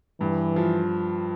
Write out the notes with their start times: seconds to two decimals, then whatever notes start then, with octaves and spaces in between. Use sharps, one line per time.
0.20 G2 E3
0.56 F3